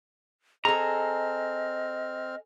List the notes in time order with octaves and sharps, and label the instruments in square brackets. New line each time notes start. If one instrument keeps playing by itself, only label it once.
[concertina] C4 F6 [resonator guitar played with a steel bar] G#4 A4 [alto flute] D#5 [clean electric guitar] A#5